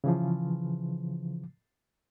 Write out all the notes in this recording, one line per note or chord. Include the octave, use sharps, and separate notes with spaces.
C#3 E3 F3